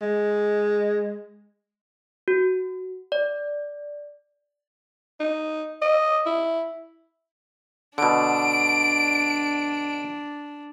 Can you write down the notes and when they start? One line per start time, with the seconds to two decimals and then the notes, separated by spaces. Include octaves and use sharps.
0.01 G#3
2.28 F#4
3.12 D5
5.20 D#4
5.82 D#5
6.26 E4
7.98 B2 D3 D4 D7